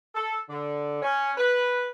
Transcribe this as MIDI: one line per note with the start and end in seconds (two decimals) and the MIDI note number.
0.15 0.37 69
0.50 1.01 50
1.02 1.31 61
1.37 1.85 71